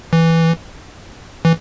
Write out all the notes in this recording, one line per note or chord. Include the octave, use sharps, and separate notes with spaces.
E3
E3